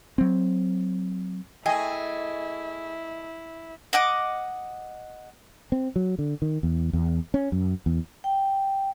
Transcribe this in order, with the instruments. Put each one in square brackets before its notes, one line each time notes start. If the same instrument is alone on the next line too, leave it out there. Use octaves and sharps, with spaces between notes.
[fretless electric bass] F#3 C4
[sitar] A3 D#5 [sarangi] E4 [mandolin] G#4 [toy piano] G5
[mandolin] D#5 F#5 D6
[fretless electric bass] C4
F#3
D3
D#3
E2
E2
C#4
F#2
E2
[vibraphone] G5